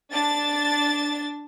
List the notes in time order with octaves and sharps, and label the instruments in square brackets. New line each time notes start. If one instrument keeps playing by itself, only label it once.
[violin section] D4 A6